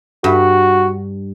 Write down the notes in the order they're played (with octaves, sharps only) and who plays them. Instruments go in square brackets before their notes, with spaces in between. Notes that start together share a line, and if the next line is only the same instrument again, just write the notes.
[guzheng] G2 [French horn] F#4